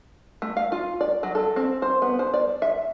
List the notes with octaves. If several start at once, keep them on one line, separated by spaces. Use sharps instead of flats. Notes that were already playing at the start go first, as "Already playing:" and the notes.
A3
F5
F4
D5
F#3
A4
C4
C5
B3
C5
D5
E5